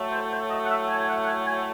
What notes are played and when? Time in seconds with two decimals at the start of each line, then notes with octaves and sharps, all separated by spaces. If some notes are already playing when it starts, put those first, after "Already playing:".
Already playing: A2 F#3 A3
0.12 C5
0.31 C5
0.50 D#5
0.64 F#5
0.70 E5
0.88 G#5
0.98 G#5
1.08 F#5
1.20 F#5
1.27 G#5
1.46 G#5